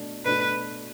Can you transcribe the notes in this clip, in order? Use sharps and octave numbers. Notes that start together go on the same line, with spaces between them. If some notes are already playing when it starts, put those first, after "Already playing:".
Already playing: B2 A3 D4 F#4
B2 A3 D4 F#4 B4